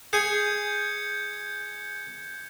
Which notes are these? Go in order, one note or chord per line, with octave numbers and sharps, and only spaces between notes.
G#4 G#5 G6 G#6 C#7